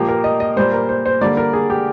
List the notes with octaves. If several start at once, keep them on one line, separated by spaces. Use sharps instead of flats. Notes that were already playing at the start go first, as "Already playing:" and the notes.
Already playing: A#2 F3 A#3 G4
A#4
D#5
D#5
A#2 G3 A#3 C5
A#4
C5
C5
D3 G3 A#3 D5
A#4
G#4
G4